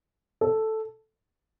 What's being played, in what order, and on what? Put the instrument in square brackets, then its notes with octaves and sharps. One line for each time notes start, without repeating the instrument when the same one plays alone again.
[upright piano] A4